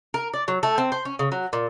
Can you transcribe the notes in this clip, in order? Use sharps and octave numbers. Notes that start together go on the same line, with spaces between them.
A#4
D5
F#3
A3
C4
C5
C#4
C#3
F#3
A#2